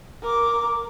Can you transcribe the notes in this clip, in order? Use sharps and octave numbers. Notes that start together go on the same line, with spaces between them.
A#4 D6